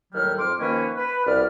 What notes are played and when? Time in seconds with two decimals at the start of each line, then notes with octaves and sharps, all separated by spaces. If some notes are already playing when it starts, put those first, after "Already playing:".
0.13 D#2 A2 F#3 G3 F6
0.38 F2 C4 C6 D6 F6
0.59 D#3 F3 A#3 C#4 B4
0.96 B4
1.26 C2 B2 D5 F6